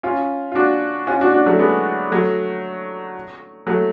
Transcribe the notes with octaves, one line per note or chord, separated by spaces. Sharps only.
C#4 F4
F4
D4 F#4
C#4 F4
D4 F#4
D4 F#4
F#3 A3
G#3 B3
F#3 A3
F#3 A3